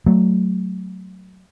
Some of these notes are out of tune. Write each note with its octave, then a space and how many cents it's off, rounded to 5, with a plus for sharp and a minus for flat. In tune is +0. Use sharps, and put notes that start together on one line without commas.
F#3 +10 A3 +0